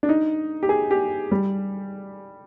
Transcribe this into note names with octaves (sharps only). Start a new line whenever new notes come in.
D4
D#4
G4
G#4
G4
G3